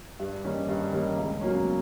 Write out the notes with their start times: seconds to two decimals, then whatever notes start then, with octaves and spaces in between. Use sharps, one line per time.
0.20 G2
0.45 D#3 G3 A#3 C#4
0.69 G2
0.92 D#3 G3 A#3 C#4
1.17 C#2
1.41 B2 F#3 A#3 C#4